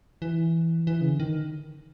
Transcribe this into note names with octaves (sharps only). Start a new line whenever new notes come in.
E3
E3
C#3
D3
D#3